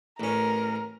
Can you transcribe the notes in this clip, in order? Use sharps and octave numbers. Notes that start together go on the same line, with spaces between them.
A1 C#4 A#4